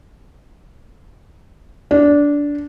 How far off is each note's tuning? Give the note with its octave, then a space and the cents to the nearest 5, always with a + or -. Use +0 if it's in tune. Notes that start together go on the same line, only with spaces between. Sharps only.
D4 -15